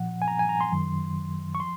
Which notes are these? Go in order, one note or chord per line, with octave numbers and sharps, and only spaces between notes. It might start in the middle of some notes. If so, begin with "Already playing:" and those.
Already playing: A#2 F3 F#5
G#5
A#5
G#5
A#5
C6
F#2 D#3 F#3
C#6
F3 C6